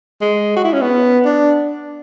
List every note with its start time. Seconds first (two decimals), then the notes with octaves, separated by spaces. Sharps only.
0.21 G#3
0.56 F#4
0.64 E4
0.73 C#4
0.81 B3
1.25 D4